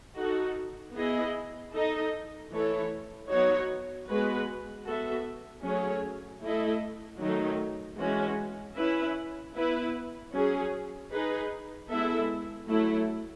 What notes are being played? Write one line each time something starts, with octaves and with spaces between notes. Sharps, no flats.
D#4 F#4 A4
B3 E4 G#4 D#5
D#4 A4 D#5
E3 A3 E4 A4 C#5
F#3 B3 D#4 F#4 C#5
G#3 B3 F#4 B4
B3 F#4 A4 E5
F#3 A3 C#4 G#4 C#5
A3 E4 A4 D#5
D#3 F#3 A3 D#4
E3 G#3 C#4 F#4
C#4 E4 B4 E5
B3 E4 B4
F#3 C#4 G#4
D#4 G#4 B4
G#3 B3 E4 A4 E5
F#3 A3 E4